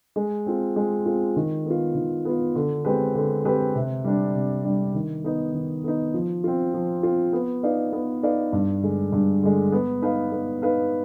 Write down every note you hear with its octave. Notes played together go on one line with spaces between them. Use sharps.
G#3
C4 F4
G#3
C4 F4
D#3
B3 F4
D#3
B3 F4
D3
G#3 C4 G4 B4
D3
G#3 C4 G4 B4
C3
G3 D4
C3
G3 D4
D#3
B3 D#4
D#3
B3 D#4
F3
C4 F4
F3
C4 F4
B3
D#4 B4 D5 F5
B3
D#4 B4 D5 F5
G2
D3 G#3
G2
D3 G#3
B3
D#4 B4 F5
B3
D#4 B4 F5